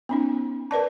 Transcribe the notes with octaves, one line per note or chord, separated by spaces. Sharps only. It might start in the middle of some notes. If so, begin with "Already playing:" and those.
B3 C#4 D#4
A#4 B4 D5 A5